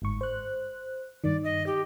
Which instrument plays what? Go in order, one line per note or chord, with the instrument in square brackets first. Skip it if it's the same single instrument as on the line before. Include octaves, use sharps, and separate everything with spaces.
[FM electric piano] G1 G#2 C#6
C5 F#6
[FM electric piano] G2 D#3 [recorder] D5
[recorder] D#5
G4